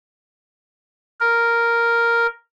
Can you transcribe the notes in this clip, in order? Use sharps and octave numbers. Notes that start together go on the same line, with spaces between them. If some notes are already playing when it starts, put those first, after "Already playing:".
A#4